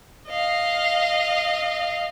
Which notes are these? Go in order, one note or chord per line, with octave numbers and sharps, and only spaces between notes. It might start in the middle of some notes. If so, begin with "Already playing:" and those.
D#5 F5